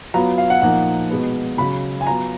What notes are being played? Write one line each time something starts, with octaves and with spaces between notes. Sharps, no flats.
F#3 B3 F4 A#5
F5
F#5
A#2 F3 A#3 D#4 F#5
B2 G#3 B3
C#3 F#3 C#4 B5
G#5
F#3 B3 F4 A#5